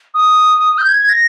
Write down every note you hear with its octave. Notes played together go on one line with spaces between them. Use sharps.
D#6
G6
G#6
G#6
A#6